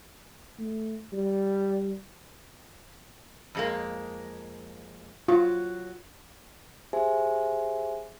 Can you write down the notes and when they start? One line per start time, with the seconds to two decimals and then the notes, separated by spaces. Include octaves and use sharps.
0.59 A3
1.13 G3
3.55 F2 G#3 A#3
5.28 F#3 F4
6.93 G4 G#4 C5 E5 G#5